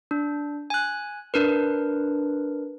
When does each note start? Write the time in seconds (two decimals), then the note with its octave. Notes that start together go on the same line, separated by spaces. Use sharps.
0.11 D4
0.70 G#5 F#6
1.34 D4 A#4 B4